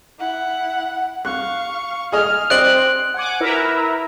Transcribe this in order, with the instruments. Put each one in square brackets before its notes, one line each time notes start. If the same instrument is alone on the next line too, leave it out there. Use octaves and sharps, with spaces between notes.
[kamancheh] E4 F#5
[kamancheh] F5 C#6 [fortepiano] F#6
[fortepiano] G#4 D#5 G#5 [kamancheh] F6
[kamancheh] C4 [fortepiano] C5 D5 D#5 [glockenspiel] F#6 D7 F#7
[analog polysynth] F#5 G#5 D6
E4 A#4 B4 E5 A#5